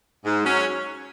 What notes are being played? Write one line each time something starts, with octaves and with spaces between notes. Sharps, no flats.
G#2
F#3 C#4